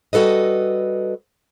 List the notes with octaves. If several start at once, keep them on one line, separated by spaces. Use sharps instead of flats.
G3 F#4 A4 B4 D#5